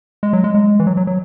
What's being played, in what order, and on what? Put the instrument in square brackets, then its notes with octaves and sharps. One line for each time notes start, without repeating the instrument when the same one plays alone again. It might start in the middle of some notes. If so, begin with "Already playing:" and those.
[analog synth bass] G#3
F#3
G#3
G#3
E3
F#3
F#3
F#3